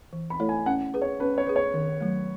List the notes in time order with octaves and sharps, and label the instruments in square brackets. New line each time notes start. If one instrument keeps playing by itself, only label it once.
[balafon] E3
[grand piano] B5
[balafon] A3 E4 A4 C#5
[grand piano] G#5
[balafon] C#4 [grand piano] F#5
[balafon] G#4 B4
[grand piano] C#5
[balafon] C#4 [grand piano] B4
[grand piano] C#5
[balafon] G#4 B4
[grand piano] C#5
[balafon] D#3
F#3 A3